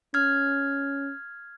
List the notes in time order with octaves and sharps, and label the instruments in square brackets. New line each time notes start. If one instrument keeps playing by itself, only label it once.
[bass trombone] C#4 [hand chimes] F6 G#6